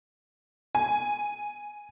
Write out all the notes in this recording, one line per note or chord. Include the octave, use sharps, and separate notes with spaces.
G#5